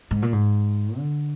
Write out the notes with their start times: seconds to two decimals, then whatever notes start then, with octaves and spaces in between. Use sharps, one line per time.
0.11 G#2
0.22 A#2
0.33 G#2
0.97 D3